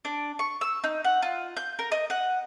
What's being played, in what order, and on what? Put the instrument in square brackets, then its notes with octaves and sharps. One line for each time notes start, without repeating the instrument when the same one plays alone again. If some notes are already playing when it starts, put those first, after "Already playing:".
[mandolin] D4
C#6
E6
D#4
F#5
F4
G6
A#4
D#5
F#5